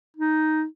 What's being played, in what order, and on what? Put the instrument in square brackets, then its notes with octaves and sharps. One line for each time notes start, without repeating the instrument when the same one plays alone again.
[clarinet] D#4